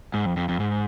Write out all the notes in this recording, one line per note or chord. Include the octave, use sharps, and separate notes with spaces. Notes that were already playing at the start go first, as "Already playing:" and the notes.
G#2
F2
F2
F2
G#2